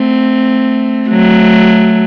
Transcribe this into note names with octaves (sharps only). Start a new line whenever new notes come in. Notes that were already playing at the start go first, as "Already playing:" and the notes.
Already playing: A3 C4
F#3 A3